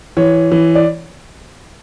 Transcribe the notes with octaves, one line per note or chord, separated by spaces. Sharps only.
E3 C#5
E3
D5